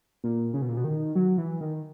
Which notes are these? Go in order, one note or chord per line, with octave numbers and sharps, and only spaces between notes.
A#2
C#3
B2
A#2
B2
D#3
F#3
E3
D#3